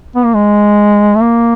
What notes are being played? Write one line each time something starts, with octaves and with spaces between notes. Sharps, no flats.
B3
A#3
G#3
A3
A#3